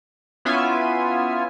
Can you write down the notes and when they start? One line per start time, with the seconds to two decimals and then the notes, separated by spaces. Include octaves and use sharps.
0.45 B3 C#4 E4 F4 E5 G#5